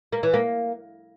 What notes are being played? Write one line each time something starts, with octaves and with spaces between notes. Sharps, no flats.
A#3
E3
A#3